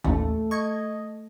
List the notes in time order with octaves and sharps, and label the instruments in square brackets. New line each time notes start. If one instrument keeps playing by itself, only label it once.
[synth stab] A1 D#2 [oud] A3
[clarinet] D#5 [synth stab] C#6 G#6